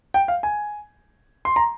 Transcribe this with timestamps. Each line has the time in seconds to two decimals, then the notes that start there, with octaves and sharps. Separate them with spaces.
0.14 G5
0.28 F5
0.43 G#5
1.45 C6
1.56 A#5